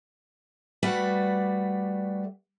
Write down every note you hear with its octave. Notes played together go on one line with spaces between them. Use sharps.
G3 A3 F#4 B4 D5